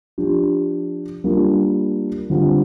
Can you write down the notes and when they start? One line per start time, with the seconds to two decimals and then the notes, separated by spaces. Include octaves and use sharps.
0.18 F3 D4 G4
1.24 G3 A#3 D4 F4
2.30 D3 G3 C4 F4